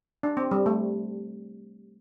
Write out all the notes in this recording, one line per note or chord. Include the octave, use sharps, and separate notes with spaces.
D4
C4
G3
A3